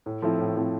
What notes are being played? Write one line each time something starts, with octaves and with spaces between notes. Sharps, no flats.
A2
F3 A3 C4 E4
A2
F3 A3 C4 E4